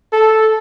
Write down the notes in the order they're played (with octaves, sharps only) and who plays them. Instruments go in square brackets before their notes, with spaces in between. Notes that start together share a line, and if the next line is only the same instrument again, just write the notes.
[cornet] A4